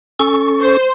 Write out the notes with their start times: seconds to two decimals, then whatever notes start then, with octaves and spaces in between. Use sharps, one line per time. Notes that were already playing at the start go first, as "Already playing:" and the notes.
0.19 C#4 A4 C#6
0.60 C5